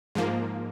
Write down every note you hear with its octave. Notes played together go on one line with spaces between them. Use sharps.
G#2 F3 A#3